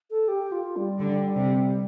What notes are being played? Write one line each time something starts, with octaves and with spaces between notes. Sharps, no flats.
A4
G4
F4
G3
D3
C3